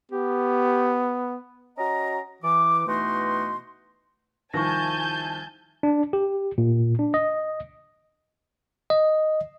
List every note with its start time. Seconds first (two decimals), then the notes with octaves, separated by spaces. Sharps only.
0.12 B3 G4
1.78 C#4 F#4 D#5 A#5
2.43 E3 D6
2.87 B2 E3 A3 D#4 F#4 C6
4.53 C2 D#3 F3 G#5 A5 C#6 G6 A#6
5.83 D4
6.13 G4
6.58 A#2
6.99 D4
7.14 D#5
8.90 D#5